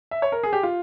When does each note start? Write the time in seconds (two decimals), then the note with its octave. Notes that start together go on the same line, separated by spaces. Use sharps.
0.11 E5
0.22 C#5
0.32 A#4
0.43 G#4
0.53 G4
0.63 F4